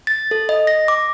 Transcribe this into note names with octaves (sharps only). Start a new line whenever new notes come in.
A6
A4
D#5
A#6
D6